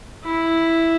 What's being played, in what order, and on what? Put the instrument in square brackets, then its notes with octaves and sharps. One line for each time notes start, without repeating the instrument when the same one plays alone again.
[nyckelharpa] E4